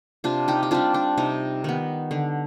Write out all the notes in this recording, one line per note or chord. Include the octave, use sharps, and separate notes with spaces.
C3 D4 F4
D#4 G4
G4
G3 C4 D4 F4
D4
C3 D#4
D#3 B3
D3